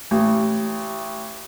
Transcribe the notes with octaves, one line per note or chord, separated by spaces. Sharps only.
A1